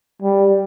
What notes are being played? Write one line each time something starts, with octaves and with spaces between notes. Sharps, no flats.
G3